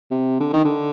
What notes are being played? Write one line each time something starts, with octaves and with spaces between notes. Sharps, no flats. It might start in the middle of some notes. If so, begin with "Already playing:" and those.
C3
D3
D#3
D3